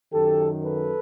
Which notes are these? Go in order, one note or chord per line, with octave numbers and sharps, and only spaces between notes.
F#2 D#3 G4 A4
A4 B4